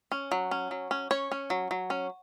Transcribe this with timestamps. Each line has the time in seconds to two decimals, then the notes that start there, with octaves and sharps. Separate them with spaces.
0.12 C#4
0.32 F#3
0.51 C#4
0.71 F#3
0.91 C#4
1.11 C#4 C#5
1.32 C#4
1.50 F#3
1.71 F#3
1.90 C#4